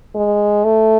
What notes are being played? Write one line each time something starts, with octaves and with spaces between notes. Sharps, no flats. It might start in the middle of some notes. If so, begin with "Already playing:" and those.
G#3
A3